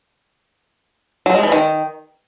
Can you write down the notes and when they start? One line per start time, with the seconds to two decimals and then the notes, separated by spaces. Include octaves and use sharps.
1.26 F#3
1.35 G#3
1.43 E3
1.52 D#3